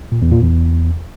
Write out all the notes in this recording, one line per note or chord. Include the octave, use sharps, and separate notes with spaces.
A#2
E2
A#2
E2